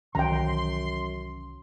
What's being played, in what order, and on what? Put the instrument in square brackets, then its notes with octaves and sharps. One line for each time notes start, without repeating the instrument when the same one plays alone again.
[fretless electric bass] C2 D#3 E3 [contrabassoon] F#2 [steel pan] G5 A#5 [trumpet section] C6